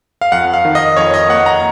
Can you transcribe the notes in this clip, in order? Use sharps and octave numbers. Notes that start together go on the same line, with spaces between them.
F5
F2 F#5
F5
D#3
D#5
F2 C#5
D#5
A#3 F#5
A#5